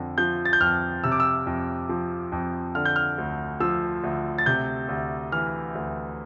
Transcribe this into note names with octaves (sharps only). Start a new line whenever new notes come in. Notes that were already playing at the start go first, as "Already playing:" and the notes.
Already playing: F2 D3
F3 G6
A6
G6
F2 F6
C3 E6
D6
E6
F2
F3
F2
D3 F6
G6
F6
D2
F3 E6
D2
A6
C3 G6
D2
E3 F6
D2